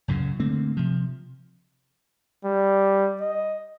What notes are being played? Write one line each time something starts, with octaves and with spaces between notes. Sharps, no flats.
C#2 F#2 A#2 C#3
D3 A3 A#3 C4
C3 F3
G3
D#5